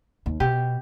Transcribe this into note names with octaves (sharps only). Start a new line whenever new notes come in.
D#2
B2 G4